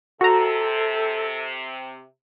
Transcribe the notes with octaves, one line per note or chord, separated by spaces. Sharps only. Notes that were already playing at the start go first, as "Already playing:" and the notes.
C3 F#4 A4 A#5